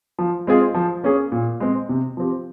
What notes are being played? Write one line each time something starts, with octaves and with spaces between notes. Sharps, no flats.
F3
G#3 C4 F4 G#4
F3
A#3 C#4 G#4
A#2
G#3 C4
C3
F3 C4 G4